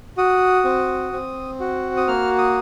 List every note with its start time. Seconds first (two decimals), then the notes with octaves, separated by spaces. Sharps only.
0.17 F#4 D#6
0.64 C4
1.13 C4
1.60 F#4
1.97 D#6
2.07 A#3 F6
2.38 D#6